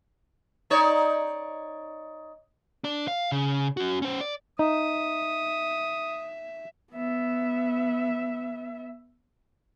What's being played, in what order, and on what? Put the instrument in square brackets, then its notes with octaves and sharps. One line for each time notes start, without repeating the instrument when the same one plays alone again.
[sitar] D#4 C#5 D5
[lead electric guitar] D4 D5
F5
C#3
C#4 F#4
C#4 C5
D5
[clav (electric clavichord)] D#4 [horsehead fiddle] E5 [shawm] D#6
[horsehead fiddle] B3 E5